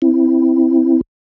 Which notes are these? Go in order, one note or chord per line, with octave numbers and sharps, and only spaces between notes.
C4 E4